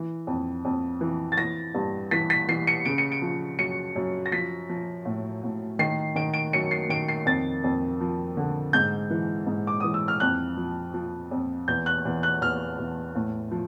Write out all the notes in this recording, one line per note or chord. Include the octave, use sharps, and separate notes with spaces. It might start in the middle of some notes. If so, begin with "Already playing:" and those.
Already playing: E3
F2
F2
E3
A6
E3 A#6
G2
E3 B6
B6
E3 C7
C#7
C#3 D7
C#7
D7
F3
F#2 C#7
F#2
A#6
F3 B6
F3
A2
A2
D#3 C7
D#3 D7
D7
F#2 C#7
C7
D#3 D7
C7
F2 A6
F2
F3
D3
G#2 G6
E3
G#2
D6
E3 D#6
E6
F6
F2 F#6
F3
F3
F2
E2 G6
F#6
E2
F#6
E2 F6
E2
A2
F3